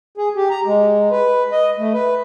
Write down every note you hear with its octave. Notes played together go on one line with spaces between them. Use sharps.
G#4
G4
A#5
G#3
B4
D#5
A3
B4